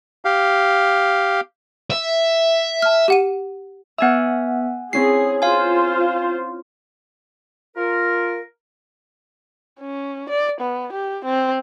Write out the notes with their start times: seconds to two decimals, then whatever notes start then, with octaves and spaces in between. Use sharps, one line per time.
0.25 G4 F5
1.90 E5
2.82 A5 F6
3.08 G4 F#5 D#7
3.98 B3 E5 F#5 G#5 E6
4.93 C4 C#4 E4 G#4 C7
5.42 F4 C5 F5 G#5
7.76 F4 A#4
9.80 C#4
10.29 D5
10.60 B3
10.92 G4
11.24 C4